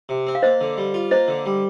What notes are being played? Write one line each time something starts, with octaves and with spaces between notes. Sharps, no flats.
C3
C4
F5
A#3 C5 D#5
D3
G3
F4
A#3 C5 D#5
D3
G3